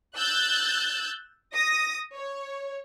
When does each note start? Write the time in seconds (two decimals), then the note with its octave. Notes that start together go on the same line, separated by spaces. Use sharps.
0.16 E6 F#6 G6 A6
1.54 D#6 A#6
2.15 C#5